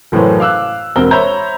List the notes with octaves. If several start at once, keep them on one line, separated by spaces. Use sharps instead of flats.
F#1 A2 E3 F#3 B4 C5
F5 D6 E6 F#6
E1 C4 A#4 G7
C5 C#5 E5 A#5 B5 G6